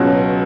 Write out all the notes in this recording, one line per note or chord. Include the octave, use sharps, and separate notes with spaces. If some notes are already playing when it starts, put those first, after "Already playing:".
Already playing: C#2 B2 F#3 C#4